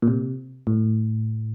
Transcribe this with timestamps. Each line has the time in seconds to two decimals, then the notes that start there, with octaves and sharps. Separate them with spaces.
0.02 A#2
0.08 C3
0.67 A2